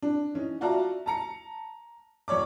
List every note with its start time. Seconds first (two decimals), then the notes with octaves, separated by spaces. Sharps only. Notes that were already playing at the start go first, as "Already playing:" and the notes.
0.02 D4
0.34 E3 C#4 D#4
0.61 F4 F#4 D5 E5 A5 A#5
1.06 A5 A#5 C#7
2.28 E1 C#5 D5 D6